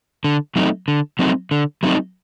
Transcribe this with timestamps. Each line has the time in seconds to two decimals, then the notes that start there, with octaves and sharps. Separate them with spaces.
0.24 D3
0.56 F#3 A3 C4 D#4
0.88 D3
1.19 F#3 A3 C4 D#4
1.51 D3
1.83 F#3 A3 C4 D#4